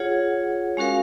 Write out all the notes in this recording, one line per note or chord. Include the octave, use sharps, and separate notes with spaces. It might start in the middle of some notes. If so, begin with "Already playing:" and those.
Already playing: F4 G#4 C#5 F#5
G#3 C#4 F#4 A#4 F5